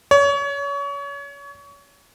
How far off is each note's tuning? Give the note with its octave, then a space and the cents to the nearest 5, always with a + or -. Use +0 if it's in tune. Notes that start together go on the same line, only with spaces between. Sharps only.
C#5 +30